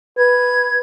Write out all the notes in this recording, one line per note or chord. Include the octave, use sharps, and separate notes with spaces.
B4 G#6